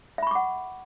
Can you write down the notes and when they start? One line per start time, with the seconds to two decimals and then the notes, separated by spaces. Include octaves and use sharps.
0.18 E5
0.23 B5
0.27 C#6
0.31 D6
0.35 F#5